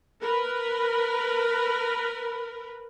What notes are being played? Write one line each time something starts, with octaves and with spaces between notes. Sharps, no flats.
A#4 B4